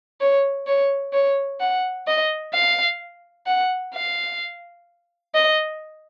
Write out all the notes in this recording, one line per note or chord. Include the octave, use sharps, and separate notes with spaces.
C#5
C#5
C#5
F#5
D#5
F5
F#5
F5
D#5